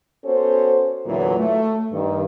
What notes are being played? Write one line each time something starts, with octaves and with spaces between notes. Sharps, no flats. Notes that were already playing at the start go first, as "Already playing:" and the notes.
B3 C#4 F#4 A4 C5
E2 A#2 D3 E3 F#3
A3
G2 D#3